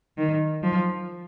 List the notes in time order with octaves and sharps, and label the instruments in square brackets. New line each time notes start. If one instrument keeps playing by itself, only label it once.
[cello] D#3
F3